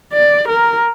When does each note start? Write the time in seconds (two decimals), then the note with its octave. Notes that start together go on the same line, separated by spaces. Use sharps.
0.13 D5
0.48 A#4